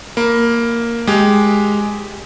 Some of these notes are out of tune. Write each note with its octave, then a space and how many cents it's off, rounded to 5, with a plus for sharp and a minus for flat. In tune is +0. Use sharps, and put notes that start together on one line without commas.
A#3 +0 B5 +0
G#3 +0 G4 +0